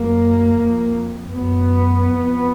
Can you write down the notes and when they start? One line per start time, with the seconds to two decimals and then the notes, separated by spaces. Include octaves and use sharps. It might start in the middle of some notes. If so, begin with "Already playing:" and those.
Already playing: F#2 A#3
0.56 F2
1.33 F#2 B3
2.10 F2